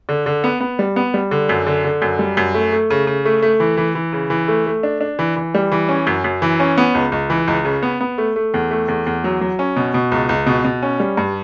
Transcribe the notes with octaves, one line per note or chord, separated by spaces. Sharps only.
D3
D3
B3
B3
G3
B3
G3
D3
F#2
D3
D3
F#2
G3
F#2
A3
A3
C#3
C#3
A3
A3
E3
E3
E3
C#3
E3
A3
A3
D4
D4
E3
E3
G3
E3
C#4
F#2
F#2
E3
C#4
B3
C#2
C#2
E3
C#2
C#3
B3
B3
A3
A3
E2
A3
E2
E2
F#3
F#3
C#4
B2
B2
C#2
C#2
B2
B2
C#4
G3
G2